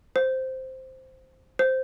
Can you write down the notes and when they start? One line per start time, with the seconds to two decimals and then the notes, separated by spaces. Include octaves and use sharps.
0.16 C5
1.59 C5